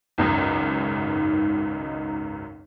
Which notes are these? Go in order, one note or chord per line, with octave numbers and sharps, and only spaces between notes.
G#1 C#2 F#2 D#4